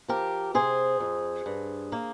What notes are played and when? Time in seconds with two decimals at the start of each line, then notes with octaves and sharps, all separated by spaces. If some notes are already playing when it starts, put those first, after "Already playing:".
0.08 F3 G4 A#4
0.54 C3 G#4 C5
1.00 F2
1.46 G2
1.92 A#3